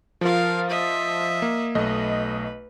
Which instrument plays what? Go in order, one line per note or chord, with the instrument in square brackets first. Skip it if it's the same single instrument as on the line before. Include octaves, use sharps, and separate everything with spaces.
[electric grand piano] F3 F4 [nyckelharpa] A#4 F5
[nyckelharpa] D#5 E5
[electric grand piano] A#3
[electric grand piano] B1 A3 D#5 [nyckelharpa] B4